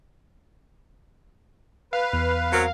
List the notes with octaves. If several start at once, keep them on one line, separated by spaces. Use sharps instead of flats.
B4 F5
E2
F#3 C4 A#4